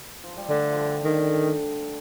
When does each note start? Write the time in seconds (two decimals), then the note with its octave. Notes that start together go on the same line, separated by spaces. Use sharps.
0.24 F3
0.36 G3
0.49 D3 A3
0.71 F3
0.76 G3
1.04 D3 D#3